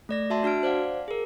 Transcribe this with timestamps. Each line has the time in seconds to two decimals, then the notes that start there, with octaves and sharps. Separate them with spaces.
0.09 A3 D5 A#6
0.30 F#4 E5 A5 C6
0.43 D4 F#4 A5 F6 D7
0.63 C5 D5 F5 F#5
1.08 G#4 A#4